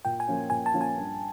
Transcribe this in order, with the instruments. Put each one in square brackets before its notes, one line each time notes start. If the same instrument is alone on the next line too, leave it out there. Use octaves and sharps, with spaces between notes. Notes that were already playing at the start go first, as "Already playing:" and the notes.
[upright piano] A#2 [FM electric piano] G5
[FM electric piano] G#5
[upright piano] F3 A#3 C#4 F4
[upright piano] A#2 [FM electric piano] G#5
[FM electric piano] A5
[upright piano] F3 A#3 C#4 F4
[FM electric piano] G#5
[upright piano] G2